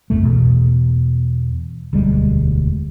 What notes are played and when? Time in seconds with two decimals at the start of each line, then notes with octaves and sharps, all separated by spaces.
0.10 A1 E2 G#2 A3
0.22 E2 B2
1.93 E1 D2 G3 G#3